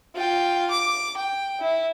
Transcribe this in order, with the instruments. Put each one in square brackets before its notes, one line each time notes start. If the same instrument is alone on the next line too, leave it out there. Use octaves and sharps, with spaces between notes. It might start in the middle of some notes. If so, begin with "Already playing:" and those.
[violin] F4 G5
D6
G5
E4